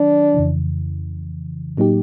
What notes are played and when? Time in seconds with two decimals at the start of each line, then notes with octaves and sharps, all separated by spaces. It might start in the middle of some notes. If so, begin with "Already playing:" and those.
Already playing: D#3 F#3 D4
0.34 F2 C#3 E3
1.77 A2 F#3 A#3 D#4 G4